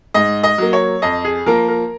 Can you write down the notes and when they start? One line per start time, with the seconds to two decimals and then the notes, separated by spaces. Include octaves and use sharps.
0.14 G#2 D#5
0.43 D#5
0.58 F#3 A#3
0.73 C#5
1.02 F2 D#5
1.24 G#4
1.46 F3 A#3 A#4
1.68 A#4